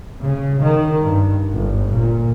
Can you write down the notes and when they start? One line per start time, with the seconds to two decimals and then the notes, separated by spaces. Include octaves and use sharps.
0.22 C#3
0.62 D#3
1.02 G2
1.53 G1
1.91 A#2